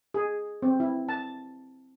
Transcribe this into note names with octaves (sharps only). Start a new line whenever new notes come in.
G#4
C4
E4
A5